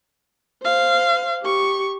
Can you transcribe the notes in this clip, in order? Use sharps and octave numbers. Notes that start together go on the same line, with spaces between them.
C5 F5
G4 C#6